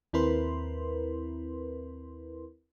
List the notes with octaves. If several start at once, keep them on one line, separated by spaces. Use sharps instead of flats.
D#2 C4 E4 A#4 B4 C6